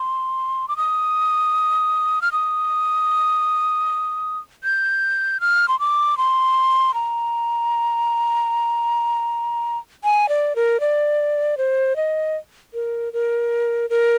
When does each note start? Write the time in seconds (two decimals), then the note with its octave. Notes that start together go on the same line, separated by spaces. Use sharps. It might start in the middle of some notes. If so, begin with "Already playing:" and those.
Already playing: C6
0.68 D6
0.77 D#6
2.22 F6
2.32 D#6
4.64 G6
5.41 F6
5.68 C6
5.80 D6
6.18 C6
6.94 A#5
10.04 G#5
10.29 D5
10.56 A#4
10.80 D5
11.58 C5
11.96 D#5
12.74 A#4
13.13 A#4
13.90 A#4